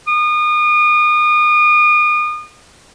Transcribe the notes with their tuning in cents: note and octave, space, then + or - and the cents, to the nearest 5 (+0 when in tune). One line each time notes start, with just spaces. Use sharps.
D#6 -35